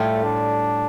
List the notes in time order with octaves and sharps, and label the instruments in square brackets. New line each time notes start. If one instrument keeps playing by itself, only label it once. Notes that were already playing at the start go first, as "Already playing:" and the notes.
Already playing: [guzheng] A2 G3 F4 [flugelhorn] A3
[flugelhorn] D4